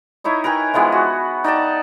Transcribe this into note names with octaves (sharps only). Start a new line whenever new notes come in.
D#4 E4 C#5 D#5
A#4 B4 G5 G#5
E3 F3 G#3 B3
F#4
D#4 D5 G5 A5